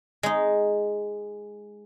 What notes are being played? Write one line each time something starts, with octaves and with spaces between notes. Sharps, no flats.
G#3 D#4